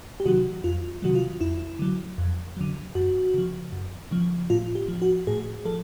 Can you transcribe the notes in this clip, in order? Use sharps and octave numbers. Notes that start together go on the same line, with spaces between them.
G4
C3 D#3 F#3 F#4
F2 F4
C3 D#3 F#3 F#4
F4
F2 E4
D3 F#3
F2
D3 F#3
F#2 F#4
C#3 F3
F#2
C#3 F3
A2 F4
G4
F3
F#4
A2 G#4
F3 A4